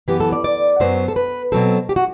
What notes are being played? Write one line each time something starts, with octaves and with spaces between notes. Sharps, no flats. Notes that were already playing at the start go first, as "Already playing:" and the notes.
F#2 E3 B3 G4
A4
D5
D5
F#2 F#3 B3 C5
A4
B4
B2 F#3 C4 A4
G4
F#4